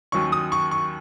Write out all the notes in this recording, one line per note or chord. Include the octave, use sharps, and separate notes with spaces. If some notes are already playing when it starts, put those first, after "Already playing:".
D#2 D#3 F#3 C#4 C#6
D#6
C#6
C#6